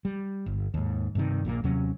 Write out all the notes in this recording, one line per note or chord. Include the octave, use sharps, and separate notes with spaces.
G3
G1
D#2 G#2
G2 C3 D#3
A#1 A#2 D3 A#3
D#2 C3 F#3 C#4